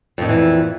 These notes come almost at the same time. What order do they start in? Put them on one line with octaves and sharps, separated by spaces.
F2 D#3 A#2 E3